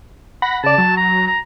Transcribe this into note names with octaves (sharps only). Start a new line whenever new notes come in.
F#5 B5 A#6
C#3 D5 A5
F#3
A#5
A#5